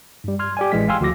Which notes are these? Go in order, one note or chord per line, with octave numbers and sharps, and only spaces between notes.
G2 G3
C6 F6 G#6
G4 D5 G#5
A1 E3 G#3 B6
F5 G5 G#5 C6 E6 F6
D2 F3 F#4 D6 A#6